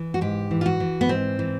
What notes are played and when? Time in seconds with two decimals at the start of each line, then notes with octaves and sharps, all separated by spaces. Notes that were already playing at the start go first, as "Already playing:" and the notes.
Already playing: E3
0.14 F#4
0.21 G#2 G4
0.51 E3
0.61 F4
0.66 F#4
0.80 E3
1.01 B3
1.09 G#2 C4
1.39 E3